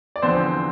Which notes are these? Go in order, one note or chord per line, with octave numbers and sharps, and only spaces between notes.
D5
E2 D3 F3 C4 C5